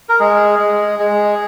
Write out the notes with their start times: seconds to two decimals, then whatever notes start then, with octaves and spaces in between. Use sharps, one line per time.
0.09 A#4
0.20 G#3 G#4
0.59 G#3
0.99 G#3